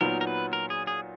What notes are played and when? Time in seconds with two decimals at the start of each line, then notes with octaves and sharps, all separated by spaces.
0.01 A#2 F#3 B3 D#4 A#4
0.21 A#4
0.27 B4
0.53 A#4
0.70 G#4
0.87 G#4